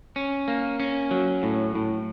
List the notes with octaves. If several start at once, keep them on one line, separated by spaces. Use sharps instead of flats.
C#4
A#3
C#4
F#3
A2
A2